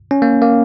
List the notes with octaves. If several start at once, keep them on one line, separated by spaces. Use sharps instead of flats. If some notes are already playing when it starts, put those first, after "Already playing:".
C#4
A#3
A#3